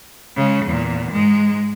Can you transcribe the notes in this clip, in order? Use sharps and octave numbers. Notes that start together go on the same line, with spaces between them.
C#3 G#3
E2 A#2
G#2 G#3